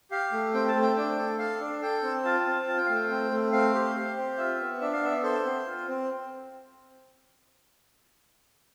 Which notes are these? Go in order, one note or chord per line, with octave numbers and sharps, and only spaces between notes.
G4 F5
A3
C4 G5
A5
A3
G5
D4 G5
A4
A4 F5
D4
A4 G5
C4
F4 A5
C4
F4 A5
G5
A3 F5
G5
C4
A3
C4 F5
G4
G4
C4
F4 E5
B3
D4 E5
F5
B3 E5
A4 C5
C4
F4
C4